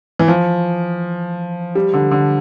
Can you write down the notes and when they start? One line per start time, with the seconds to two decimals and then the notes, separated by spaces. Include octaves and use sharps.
0.19 E3
0.28 F3
1.75 G3
1.94 D3
2.11 D3